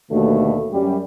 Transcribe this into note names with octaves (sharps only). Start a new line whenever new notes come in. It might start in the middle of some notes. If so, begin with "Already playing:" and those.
D#2 B2 D3 A3 F#4
F#2 G3